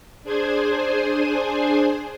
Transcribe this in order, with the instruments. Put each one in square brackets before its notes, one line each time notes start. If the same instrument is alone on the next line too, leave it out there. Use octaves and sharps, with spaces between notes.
[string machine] D4 G#4 C5 G#5